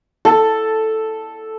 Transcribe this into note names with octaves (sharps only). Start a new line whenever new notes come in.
A4